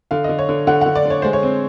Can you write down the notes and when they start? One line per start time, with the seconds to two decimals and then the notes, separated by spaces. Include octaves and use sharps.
0.11 D3 F5
0.24 D3 D#5
0.39 C#5
0.49 D3
0.67 D3 F#5
0.81 D3 F#5
0.95 D5
1.05 D3 C#5
1.22 G#3 C5
1.33 C#5
1.43 C4